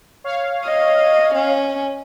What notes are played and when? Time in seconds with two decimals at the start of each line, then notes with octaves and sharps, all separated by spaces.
0.24 C#5 F5
0.65 D#5
1.34 C#4